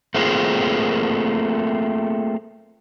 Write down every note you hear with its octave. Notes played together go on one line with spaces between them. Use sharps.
A3 A#3 C4 F4 G#4 A#4